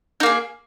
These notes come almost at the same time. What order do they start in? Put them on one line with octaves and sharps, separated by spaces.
D#4 A#3 G#4